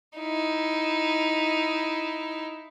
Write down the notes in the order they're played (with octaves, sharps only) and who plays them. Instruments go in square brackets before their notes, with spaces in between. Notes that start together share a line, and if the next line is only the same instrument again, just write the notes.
[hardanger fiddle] D#4 E4